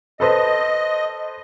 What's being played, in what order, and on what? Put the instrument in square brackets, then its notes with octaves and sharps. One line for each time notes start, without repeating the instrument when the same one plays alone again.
[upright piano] A4 B4 C5 [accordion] D#5